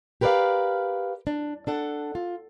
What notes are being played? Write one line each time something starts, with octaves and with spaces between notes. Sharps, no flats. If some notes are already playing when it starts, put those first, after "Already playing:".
G4 A#4 B4 C#5 D5 F5
D4
D4 A4 F#5
F4